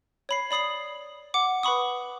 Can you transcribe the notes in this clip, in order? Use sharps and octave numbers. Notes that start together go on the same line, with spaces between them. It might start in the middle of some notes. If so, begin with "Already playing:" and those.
C#5 B5 C7
D5 B5 D#6 C7 F#7
F#5 D6
B4 F#5 B5 C#6 D#6